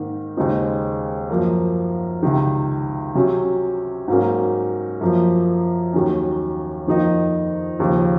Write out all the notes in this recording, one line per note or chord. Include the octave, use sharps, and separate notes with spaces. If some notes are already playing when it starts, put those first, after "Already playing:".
Already playing: G#2 D#3 A#3
D#2 C#3 G#3 C4 D#4
F#2 F3 A#3
C#2 C3 D#3
C3 F#3 C#4
G#2 F#3 A#3 C#4
F#2 F3 A#3
D#2 D#3 F#3 C#4
F2 D#3 A#3 D#4
D#2 C#3 F3